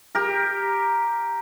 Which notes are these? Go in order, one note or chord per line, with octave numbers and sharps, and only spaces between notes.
G4 A#4